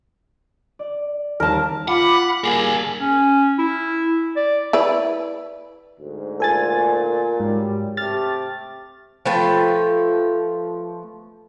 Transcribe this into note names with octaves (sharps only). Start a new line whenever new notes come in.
D5
D#2 G3 C4 A#4 A5
F4 F#5 B5 D6
G3 A#3 G#4 A#4 G#5
C#4
E4
D5
E4 B4 D5
D2 G#2
A#2 A4 G#5 A6
G#2 F#3 G3
C3 A3 G4 F6 A6
F3 A3 B4 G5